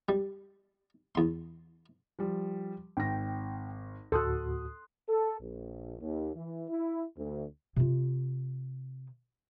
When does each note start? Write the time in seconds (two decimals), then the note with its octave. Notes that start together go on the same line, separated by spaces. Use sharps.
0.09 G3
1.15 E2 C6
2.19 F3 G3
2.97 G#1 G5 A#6
4.12 D2 A2 F#4 A4 C6 D#6 F#6
5.09 A4
5.41 A#1
6.00 D#2
6.35 E3
6.69 E4
7.17 D2
7.76 C3 F4